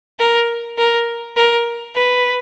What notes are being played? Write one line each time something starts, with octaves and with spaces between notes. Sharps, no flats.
A#4
A#4
A#4
B4